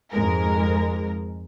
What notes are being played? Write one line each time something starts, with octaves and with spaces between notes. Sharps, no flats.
F2 G#2 G#3 A#4